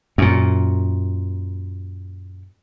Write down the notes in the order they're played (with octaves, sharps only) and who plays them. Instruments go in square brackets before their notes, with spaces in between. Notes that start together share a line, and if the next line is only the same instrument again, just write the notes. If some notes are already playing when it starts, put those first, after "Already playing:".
[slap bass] F#2 A#2